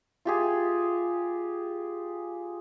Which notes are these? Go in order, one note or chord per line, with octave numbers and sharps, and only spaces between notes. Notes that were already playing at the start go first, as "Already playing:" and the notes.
F4 G4 G#4